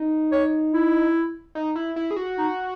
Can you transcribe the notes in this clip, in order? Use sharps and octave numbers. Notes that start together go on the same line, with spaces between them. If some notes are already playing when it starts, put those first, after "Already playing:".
Already playing: D#4
C#5
E4
D#4
E4
E4
G#4
F#4
D#4